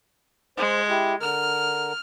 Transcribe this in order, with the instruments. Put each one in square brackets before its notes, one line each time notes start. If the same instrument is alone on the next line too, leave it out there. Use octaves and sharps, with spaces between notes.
[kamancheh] G#3 [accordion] C5
[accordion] E4 G4
[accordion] D3 A#4 [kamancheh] F6